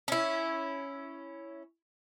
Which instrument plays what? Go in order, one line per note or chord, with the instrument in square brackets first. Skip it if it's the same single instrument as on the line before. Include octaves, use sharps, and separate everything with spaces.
[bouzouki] C#4 E4